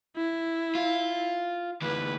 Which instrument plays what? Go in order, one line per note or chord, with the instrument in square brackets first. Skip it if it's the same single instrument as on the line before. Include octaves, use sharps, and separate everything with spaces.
[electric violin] E4
[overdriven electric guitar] F4
[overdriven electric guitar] D2 E3 [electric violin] B4